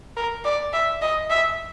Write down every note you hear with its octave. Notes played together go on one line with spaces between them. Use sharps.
A#4
D5
E5
D#5
E5